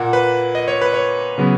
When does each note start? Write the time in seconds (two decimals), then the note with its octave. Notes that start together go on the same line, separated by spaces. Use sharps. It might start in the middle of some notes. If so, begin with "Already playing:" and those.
Already playing: A#2 A#3 F#5
0.13 B4
0.55 D#5
0.68 C#5
0.81 B4
0.94 C#5
1.38 C#3 F#3 B3